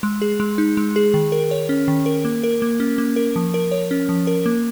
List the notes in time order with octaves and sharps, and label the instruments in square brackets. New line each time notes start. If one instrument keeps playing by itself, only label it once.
[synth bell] G#3
G#4
G#3
D#4
G#3
G#4
D#3
A#4
C#5
C#4
D#3
A#4
A#3
A#4
A#3
C#4
A#3
A#4
F3
A#4
C#5
C#4
F3
A#4
A#3